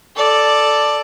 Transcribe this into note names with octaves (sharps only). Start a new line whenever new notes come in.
A4 D5